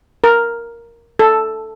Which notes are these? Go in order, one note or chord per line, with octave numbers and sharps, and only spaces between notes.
A#4
A4